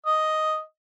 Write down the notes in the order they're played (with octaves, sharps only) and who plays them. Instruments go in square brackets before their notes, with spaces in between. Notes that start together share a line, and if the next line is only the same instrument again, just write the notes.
[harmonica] D#5